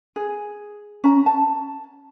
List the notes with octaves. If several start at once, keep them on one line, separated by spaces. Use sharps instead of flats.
G#4
C#4 A#5
A5